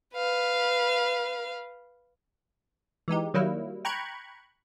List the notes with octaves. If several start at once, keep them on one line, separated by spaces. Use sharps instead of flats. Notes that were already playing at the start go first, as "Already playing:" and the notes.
B4 F5
E3 G#3 D#4 G4
D#3 F#3 G3 A#3 E4
G5 A#5 B5 C#6 F#6 G#6